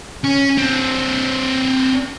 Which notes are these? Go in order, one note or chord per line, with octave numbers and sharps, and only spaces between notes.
C#4
C4 D4